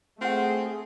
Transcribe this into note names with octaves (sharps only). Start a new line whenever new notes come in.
A3 C4 F4 G#4 F#5